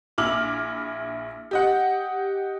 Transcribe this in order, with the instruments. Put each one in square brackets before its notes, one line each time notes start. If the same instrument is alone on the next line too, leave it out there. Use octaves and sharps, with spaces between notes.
[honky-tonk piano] A#1 E4 D6 E6 F6 F#7
G4 D#5 F#5